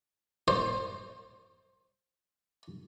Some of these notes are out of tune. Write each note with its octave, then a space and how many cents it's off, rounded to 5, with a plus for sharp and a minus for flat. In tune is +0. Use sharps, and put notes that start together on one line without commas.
C5 +10